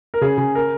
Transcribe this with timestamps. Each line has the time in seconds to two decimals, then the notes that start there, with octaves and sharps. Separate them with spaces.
0.14 A#4
0.21 C#3 G#4
0.38 C#3
0.55 A#4